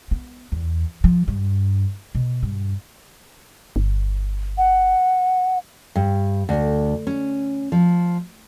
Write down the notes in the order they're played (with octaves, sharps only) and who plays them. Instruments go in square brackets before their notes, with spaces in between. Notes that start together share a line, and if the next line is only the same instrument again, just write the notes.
[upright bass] B3
E2
F3
G2
B2
G2
[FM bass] G1
[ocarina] F#5
[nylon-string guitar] G2
D2
C#4
F3